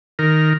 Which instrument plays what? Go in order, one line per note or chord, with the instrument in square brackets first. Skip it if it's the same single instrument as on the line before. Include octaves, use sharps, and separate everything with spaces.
[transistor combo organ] D#3 A#4